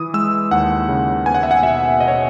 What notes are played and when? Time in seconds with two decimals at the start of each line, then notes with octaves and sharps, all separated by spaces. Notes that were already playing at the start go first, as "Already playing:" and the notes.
Already playing: E3 D#6
0.14 G#3 E6
0.51 D#2 F#5
0.89 C#3
1.26 B3 G#5
1.34 F#5
1.43 E5
1.51 F#5
1.63 B2 E5
2.00 B2 D#5
2.08 C#5